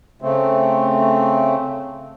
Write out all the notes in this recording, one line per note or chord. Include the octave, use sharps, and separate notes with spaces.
C#3 A3 C4